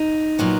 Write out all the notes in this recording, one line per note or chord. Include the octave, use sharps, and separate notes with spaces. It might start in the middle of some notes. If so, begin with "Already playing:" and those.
Already playing: D#4
A#2 F#3 B3